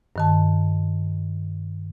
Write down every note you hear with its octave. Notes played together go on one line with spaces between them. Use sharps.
G2 D#3 A5